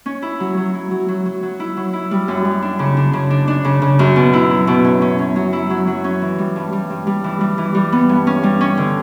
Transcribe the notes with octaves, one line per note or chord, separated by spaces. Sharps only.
C#4
E4
F#3
F#3
E4
F#3
F#3
F#3
F#3
E4
F#3
E4
G3
F#2
G3
D4
C#3
D4
C#3
D4
D4
C#3
C#3
F#2
B2
E4
F#3
B2
C#4
C#4
C#4
F#3
E4
F#3
F#3
C#4
E3
G3
G2
G3
G2
G3
E3
G3
E3
G3
B3
G2
C#4
G3
C#4
D3